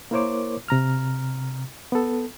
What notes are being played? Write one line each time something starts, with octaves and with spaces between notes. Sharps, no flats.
A#3 E4 A#4 C5 C#5 D6
C3 A#5 F6
B3 A4